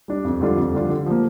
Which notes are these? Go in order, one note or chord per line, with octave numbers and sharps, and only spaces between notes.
G3 D4
F2
D3 G3 D4 F4
F2
D3 G3 D4 F4
D3
F3 A#3